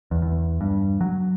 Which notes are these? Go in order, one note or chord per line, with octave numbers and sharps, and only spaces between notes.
E2
E2
G2
F#3